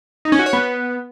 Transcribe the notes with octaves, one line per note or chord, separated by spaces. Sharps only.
D#4
C#4
F#4
C#5
B3